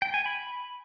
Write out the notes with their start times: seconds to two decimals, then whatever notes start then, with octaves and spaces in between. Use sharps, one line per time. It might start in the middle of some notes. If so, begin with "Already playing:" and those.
0.02 G5
0.14 G#5
0.26 B5